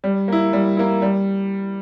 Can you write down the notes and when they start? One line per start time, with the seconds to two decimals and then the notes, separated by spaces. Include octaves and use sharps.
0.04 G3
0.28 A#3 E4
0.53 G3
0.77 A#3 E4
1.02 G3